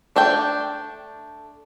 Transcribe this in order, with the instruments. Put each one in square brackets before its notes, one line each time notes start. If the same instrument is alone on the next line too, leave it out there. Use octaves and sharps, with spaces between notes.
[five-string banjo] A3 D4 E5 G5